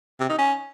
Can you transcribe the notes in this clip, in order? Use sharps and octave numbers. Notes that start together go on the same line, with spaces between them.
C3
D#4
C#4